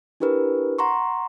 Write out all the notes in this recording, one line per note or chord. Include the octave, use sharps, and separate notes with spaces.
D4 E4 G4 A#4 B4
F#5 A#5 C6 C#6